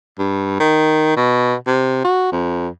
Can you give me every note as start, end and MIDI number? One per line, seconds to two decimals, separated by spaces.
0.18 0.57 43
0.60 1.15 51
1.16 1.55 47
1.67 2.00 48
2.04 2.29 66
2.32 2.68 41